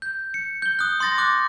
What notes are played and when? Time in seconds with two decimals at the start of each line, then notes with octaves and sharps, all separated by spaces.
0.02 G6
0.34 C#7
0.62 G6 G7
0.79 D#6 F#6
1.00 C6 D#6 A6 A#6
1.18 D6 F#6